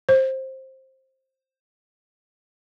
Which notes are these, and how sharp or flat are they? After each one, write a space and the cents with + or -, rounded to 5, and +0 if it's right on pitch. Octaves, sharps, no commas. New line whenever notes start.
C5 +15